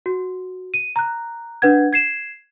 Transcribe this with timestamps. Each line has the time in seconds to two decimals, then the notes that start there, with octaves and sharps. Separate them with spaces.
0.06 F#4
0.74 D#7
0.96 A#5 F#6
1.62 D4 B4 F#5 G#6
1.93 G#6 C7 E7